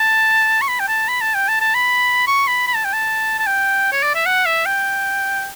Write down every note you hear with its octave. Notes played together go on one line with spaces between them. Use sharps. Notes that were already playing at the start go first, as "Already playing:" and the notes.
Already playing: A5
C#6
B5
G5
A5
B5
A5
G5
A5
A5
B5
C#6
B5
B5
A5
G5
A5
A5
G5
C#5
D5
E5
F#5
E5
G5